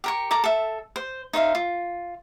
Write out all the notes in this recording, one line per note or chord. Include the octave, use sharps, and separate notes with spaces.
G4 A#4 C#6
A4 A#4 A#5 D6
A4 E5
C5
D#4 C5 E5 F5
F4